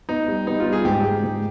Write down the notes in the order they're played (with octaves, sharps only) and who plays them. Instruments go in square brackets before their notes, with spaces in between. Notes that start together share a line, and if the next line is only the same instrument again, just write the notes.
[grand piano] B3 [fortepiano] D#4
[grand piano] G3
[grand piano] B3 [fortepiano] D#4
[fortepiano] F4
[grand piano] G3
[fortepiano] G#4
[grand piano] G#2 [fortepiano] G4
[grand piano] G#3
G#2